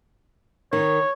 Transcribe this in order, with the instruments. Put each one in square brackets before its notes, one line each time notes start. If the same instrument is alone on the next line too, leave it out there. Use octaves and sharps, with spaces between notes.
[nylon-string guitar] D#3 [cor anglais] C#5